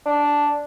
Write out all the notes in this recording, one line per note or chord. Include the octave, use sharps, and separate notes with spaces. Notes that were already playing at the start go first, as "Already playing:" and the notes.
D4